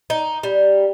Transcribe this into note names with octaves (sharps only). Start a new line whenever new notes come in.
D#4
G3